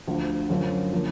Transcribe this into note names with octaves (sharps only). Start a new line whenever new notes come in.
D2 D3 F3
F#2 D3 F3
D3 F3 A#3